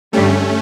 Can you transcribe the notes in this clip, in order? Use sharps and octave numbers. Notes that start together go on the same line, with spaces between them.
G2 D3 G3 A3 C#4